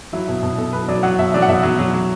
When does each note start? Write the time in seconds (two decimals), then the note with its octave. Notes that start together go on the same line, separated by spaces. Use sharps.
0.13 F#3 E4
0.28 B2 E4
0.43 B2
0.58 B2 A4
0.73 F#3 B4
0.88 F#3 D5
1.03 F#3 F#5
1.19 B2 E5
1.34 F#3 D5
1.42 F#5
1.48 B2 E5
1.63 F#3
1.79 F#3
1.93 F#3